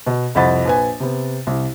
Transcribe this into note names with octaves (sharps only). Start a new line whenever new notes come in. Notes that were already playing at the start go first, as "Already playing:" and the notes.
B2
C2 F2 D#5 F#5 B5 A6
A#1 B4 G#5
C3 B3
C2